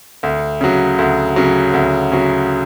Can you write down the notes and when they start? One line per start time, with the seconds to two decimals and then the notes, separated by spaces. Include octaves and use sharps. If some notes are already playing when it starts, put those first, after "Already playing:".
0.23 D2
0.61 C#3 F#3
0.99 D2
1.36 C#3 F#3
1.73 D2
2.12 C#3 F#3